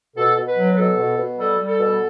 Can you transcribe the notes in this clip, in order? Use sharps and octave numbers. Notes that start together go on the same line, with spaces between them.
B2 A4
B2
B4
F#3
B4
B2 A4
B2
B2
G3 A4
G3
A4
B2